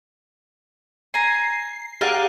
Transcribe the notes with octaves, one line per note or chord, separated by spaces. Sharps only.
G#5 A#5 C7
G4 G#4 A#4 D5 F5 F#5